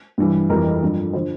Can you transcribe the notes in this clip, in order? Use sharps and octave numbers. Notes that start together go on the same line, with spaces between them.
G2 E3 G3
F2 E3 G3 A#4
G2 F3
D3 F3 C5